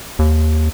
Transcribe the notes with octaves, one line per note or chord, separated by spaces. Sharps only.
D#2